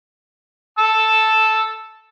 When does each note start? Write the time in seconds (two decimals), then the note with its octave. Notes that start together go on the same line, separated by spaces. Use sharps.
0.78 A5 E6